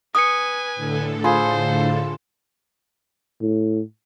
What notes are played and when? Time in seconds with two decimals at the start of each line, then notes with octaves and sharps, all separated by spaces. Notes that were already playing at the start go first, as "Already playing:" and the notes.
0.15 B4 G#5 D#6 C#7
0.75 A2 D3 A4
1.24 F4 G#4 C5 B5
3.41 A2